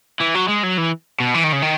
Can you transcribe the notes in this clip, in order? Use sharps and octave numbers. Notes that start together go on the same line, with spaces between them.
E3
F#3
G#3
F#3
E3
B2
E3
D#3
C#3
D#3